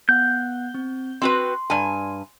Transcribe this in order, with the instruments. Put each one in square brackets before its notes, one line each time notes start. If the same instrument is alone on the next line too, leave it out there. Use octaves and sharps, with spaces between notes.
[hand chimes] B3 F#5 F#6 [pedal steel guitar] G6
[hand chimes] C4
[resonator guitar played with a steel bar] C4 F#4 B4 [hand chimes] C6
[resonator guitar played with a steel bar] G2 G#5